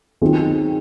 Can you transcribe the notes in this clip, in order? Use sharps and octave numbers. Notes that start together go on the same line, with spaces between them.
D#3 F#3 C4 F4 G#4